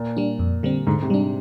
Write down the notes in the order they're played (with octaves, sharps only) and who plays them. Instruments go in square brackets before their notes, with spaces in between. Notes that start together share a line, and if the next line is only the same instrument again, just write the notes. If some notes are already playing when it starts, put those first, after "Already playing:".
Already playing: [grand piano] A#2
[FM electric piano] G3 D4
F2
D3 G3 C4
[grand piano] G#2 [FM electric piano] D3
[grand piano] C3
[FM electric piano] G3 D4